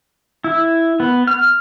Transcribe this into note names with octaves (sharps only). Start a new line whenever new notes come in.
E4
B3
F6